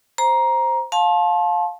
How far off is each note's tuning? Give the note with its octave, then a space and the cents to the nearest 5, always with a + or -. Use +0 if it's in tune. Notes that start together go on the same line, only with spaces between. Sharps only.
C5 +0 A#5 +15
F5 +20 A5 -20 C6 +40